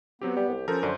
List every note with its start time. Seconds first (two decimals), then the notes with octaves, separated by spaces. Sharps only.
0.21 F#3 B3 C4 G4
0.37 G3 G4
0.49 C2
0.68 F3 C#4 A4 A#4 C5
0.83 F#2 D3